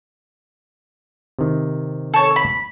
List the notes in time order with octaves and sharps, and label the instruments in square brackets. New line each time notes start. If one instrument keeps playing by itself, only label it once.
[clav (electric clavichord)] C3 D#3
[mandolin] A4 C#5
B5